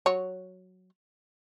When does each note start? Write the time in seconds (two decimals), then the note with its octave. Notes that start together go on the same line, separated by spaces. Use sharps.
0.06 F#3 C#5